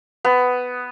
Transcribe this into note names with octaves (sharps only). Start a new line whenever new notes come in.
B3